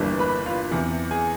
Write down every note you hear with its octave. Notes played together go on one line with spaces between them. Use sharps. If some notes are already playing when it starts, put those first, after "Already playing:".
Already playing: G1 G2 E3 G3 A#3
B4 B5
F4 F5
E2 C3 E3
G#4 G#5